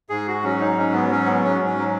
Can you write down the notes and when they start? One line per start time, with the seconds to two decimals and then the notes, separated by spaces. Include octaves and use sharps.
0.10 G#2 G#4
0.27 F#4
0.44 F#3 C#4
0.60 D#4
0.77 G#2 C#4
0.94 B3
1.10 F#3 C#4
1.26 B3
1.43 G#2 C#4
1.66 C#4
1.77 F#3